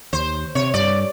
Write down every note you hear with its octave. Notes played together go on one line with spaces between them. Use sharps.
D#2 C5
C3 C#5
G2 D5